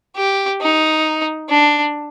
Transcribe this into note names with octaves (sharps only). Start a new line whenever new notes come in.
G4
D#4
D4